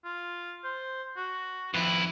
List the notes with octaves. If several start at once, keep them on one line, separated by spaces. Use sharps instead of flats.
F4
C5
F#4
F2 E4 B4